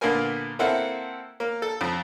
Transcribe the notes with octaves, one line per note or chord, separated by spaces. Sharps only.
A#2 D3 A#3 B3 A#4 G#5
A#3 C4 E4 A4 F#5
A#3
A4
F2